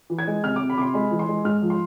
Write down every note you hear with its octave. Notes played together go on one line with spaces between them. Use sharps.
E3
G#6
G#3
C3 F6
C3 D6
B5
C3 C6 D6
G#3 B5
E3
C6
G#3
G#2 F6
F3
C6